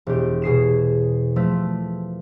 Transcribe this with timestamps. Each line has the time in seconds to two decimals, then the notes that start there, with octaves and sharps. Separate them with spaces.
0.07 E1 G4
0.42 B2 G#4 C7 E7
1.36 F3 A3 A4